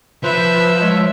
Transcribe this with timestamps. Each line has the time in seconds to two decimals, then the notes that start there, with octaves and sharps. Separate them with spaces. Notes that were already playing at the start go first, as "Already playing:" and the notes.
0.24 F3 B4 C5 E5
0.81 G#3 C#5 E6